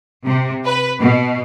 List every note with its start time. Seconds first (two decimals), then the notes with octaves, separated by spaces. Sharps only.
0.25 C3
0.65 B4
1.01 B2